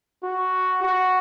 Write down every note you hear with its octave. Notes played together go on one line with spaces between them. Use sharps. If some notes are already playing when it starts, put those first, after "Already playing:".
F#4
F#4